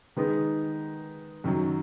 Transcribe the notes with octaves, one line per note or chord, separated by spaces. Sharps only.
D#3 G#3 B3 D#4
F#2 D#3 F#3